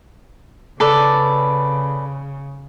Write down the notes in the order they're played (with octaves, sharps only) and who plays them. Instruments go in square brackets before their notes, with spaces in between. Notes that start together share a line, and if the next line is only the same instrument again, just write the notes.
[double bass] C#3 [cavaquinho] A4 B4 D5